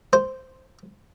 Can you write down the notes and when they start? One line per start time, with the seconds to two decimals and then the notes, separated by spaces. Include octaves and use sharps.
0.13 C5